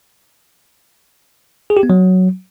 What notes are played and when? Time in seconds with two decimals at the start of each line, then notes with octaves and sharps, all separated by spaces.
1.70 G#4
1.77 G4
1.83 B3
1.90 F#3